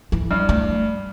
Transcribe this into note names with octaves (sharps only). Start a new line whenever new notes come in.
E3
G2
A3